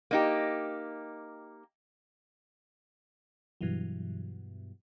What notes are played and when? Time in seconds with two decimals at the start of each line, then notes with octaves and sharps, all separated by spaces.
0.11 A#3 D#4 G4
3.61 G2 B2 E3 F#3